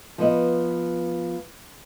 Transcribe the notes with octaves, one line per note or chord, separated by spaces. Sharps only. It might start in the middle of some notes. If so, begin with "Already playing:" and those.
F3 B3 D#5